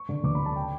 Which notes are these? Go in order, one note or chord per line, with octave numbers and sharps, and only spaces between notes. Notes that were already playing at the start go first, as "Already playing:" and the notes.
Already playing: C#6
D3
D2 D6
B5
D3
A5
G5